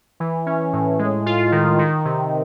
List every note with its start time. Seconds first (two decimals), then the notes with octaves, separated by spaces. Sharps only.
0.20 E3
0.47 C#4
0.73 A2
0.99 G#3
1.26 F4
1.52 D#3
1.79 D#3
2.05 C3